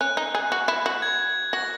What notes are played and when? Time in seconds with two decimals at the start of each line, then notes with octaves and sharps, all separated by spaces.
0.01 C#4 F#6
0.17 D#4
0.35 G#4
0.52 F#4
0.68 E4
0.86 F#4
1.02 G#6
1.53 F#4 A#6